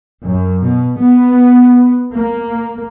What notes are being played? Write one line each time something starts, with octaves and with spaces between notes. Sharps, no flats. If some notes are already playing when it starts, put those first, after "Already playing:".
F#2
B2
B3
A#3